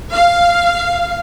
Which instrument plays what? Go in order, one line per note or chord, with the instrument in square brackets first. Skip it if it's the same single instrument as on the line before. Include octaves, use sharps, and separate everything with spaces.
[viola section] F5